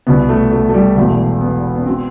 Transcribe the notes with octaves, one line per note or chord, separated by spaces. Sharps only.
C2 B2 B3
A3
A3
A3
G3
E1 E2 B2 A3
B3
B3
B2 C4